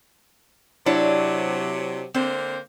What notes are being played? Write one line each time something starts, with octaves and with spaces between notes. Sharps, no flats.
C3 F#3 D4 E4 C#5
D3 A#3 C4 C5